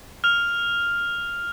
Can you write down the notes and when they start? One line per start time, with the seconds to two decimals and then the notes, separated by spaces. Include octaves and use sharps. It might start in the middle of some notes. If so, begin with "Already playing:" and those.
0.24 F6 F7